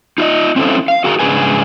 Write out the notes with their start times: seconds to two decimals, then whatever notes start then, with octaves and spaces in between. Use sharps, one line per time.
0.18 D#4 F4 D5 D#5
0.56 C4 C#4 E4 A4 C5
0.88 F5
1.04 F#4 G#4 A#4 A#5
1.19 G#2 C#3 D4 G#4 B4 G#5